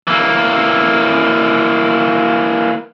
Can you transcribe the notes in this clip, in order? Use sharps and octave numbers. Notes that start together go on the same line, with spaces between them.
E3 A#3